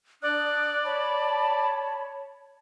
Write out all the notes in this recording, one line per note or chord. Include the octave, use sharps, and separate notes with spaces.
D4 D5 D#6 F#6
C#5 A5 B5